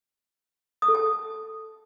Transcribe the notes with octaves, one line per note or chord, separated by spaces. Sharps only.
D#6
A4
A5